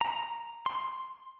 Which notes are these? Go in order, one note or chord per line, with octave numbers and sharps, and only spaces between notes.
A#5
C6